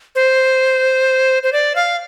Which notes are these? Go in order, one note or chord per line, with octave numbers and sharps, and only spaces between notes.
C5
C5
D5
F5